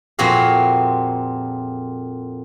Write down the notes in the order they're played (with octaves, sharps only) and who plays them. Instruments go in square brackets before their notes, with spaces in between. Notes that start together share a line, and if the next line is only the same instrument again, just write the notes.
[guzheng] F2 A#2 C4 F#4 G#4 F5